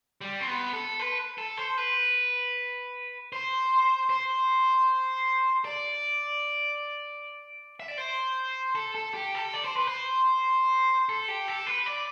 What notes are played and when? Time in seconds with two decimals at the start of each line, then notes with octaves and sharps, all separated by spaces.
0.21 G3
0.40 C4
0.47 B3
0.73 A4
1.00 B4
1.38 A4
1.57 C5
1.78 B4
3.32 C5
4.10 C5
5.65 D5
7.80 E5
7.88 D5
7.98 C5
8.75 A4
8.95 A4
9.14 G4
9.35 A4
9.53 D5
9.65 C5
9.76 B4
9.88 C5
11.09 A4
11.28 G4
11.48 A4
11.66 B4
11.86 D5